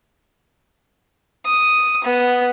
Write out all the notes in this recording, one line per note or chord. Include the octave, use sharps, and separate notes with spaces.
D#6
B3